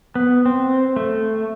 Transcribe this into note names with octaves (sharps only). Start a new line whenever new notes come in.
B3
C4
A3